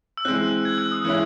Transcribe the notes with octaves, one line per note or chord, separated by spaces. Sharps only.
E6
E3 G#3 C4 F#6
G#6
E6
D#6
E3 G#3 C#4 E4 F#6